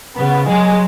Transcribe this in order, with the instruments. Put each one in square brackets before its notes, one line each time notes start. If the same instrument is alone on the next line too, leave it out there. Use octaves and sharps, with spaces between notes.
[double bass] C#3 [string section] B3
[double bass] F#3 [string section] G#3